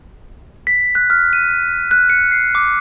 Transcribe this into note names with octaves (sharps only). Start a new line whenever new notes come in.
B6
F#6
F6
D#7
F#6
C#7
C7
D6